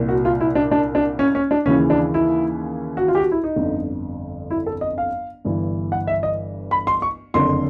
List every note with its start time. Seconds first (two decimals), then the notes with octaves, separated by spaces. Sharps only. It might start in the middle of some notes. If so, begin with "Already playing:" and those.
Already playing: C2 A#2
0.09 F#4
0.25 F4
0.41 E4
0.55 D4
0.71 D4
0.95 D4
1.19 C#4
1.35 C#4
1.51 D4
1.66 D#2 C#3 E3 C#4
1.90 D4
2.14 E4
2.97 F#4
3.08 F4
3.15 G4
3.19 F#4
3.31 E4
3.44 D#4
3.56 G1 F2 D3
4.50 E4
4.66 A4
4.81 D#5
4.98 F5
5.45 G1 G2 E3
5.92 F#5
6.07 E5
6.23 D#5
6.71 B5
6.87 C6
7.02 C#6
7.34 F#1 F2 D3 C6